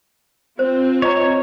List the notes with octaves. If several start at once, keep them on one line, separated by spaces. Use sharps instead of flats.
C4 F4 C5
C#5 D#5 A#5